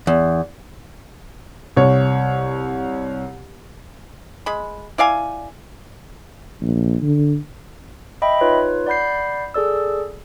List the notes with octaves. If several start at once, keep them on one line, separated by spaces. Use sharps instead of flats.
E2
C2 C#5
G#3 B5
E4 D5 F5 G#5
A#1
D3
D#5 E5 G5 B5
D#4 F4 B4 C#5
D5 F#5 B5 G6 C7
G#4 A4 D5 E6